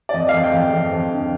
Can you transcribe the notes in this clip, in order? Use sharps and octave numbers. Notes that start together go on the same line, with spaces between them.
D5
F2 D#5
F5
F2
G5
F2
F2
F2
D3